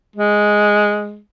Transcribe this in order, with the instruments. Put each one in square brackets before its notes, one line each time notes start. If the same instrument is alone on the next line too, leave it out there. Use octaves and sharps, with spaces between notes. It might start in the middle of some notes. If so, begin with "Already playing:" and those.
[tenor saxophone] G#3